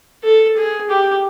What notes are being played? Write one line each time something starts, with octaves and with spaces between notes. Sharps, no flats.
A4
G#4
G4